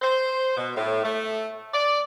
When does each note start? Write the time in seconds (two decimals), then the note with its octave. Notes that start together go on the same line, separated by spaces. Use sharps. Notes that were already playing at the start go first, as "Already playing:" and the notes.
0.01 C5
0.57 B2
0.76 A2
1.03 A3
1.73 D5